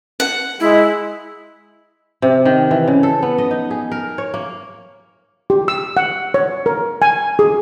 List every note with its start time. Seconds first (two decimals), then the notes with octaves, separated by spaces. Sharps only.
0.20 F#5
0.60 G#3 E4
2.22 C3
2.45 D#3
2.71 E3
2.88 C#3
3.03 A4
3.23 B3
3.38 D#5
3.51 D#4
3.71 G#4
3.91 A#4
4.18 C#5
4.34 A#3
5.50 G4
5.68 E6
5.97 F#5
6.34 C#5
6.66 A#4
7.02 G#5
7.39 G#4